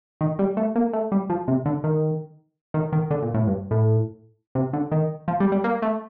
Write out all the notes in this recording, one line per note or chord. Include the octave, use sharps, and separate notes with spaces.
D#3
G3
A3
A#3
A3
G3
F3
C3
D3
D#3
D#3
D#3
D3
A#2
A2
G2
A2
C3
D3
D#3
F3
G3
G3
A#3
A3